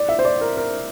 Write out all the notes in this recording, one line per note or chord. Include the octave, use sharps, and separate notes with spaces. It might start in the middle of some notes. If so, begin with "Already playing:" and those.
Already playing: D5
E5
C5
D5
A#4
A#4